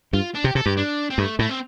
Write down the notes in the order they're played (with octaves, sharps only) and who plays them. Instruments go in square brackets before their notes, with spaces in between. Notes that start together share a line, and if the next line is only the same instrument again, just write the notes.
[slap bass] G2 [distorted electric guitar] F4
[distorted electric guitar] D4
[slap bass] C3 [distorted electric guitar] G4
[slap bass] C3 [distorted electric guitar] A4
[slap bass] G2 [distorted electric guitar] G4
[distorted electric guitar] D4
C4
[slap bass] G2 [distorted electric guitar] A3
[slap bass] A2 [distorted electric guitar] A3
[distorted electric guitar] C4